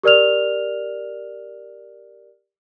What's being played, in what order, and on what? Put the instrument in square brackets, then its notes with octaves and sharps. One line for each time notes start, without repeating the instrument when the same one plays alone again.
[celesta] G4 A#4 D5 F6 F7